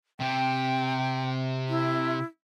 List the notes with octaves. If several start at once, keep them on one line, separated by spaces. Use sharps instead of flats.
C3 G4 G5
E4